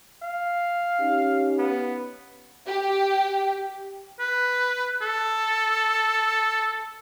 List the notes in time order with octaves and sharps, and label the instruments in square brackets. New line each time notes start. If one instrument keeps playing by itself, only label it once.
[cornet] F5
[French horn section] C#4 D#4 G4
[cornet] B3
[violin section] G4
[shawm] B4
A4